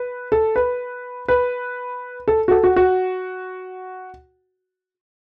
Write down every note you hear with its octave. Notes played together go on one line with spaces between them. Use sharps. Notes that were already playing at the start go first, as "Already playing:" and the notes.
Already playing: B4
A4
B4
B4
A4
F#4
A4
F#4
F#4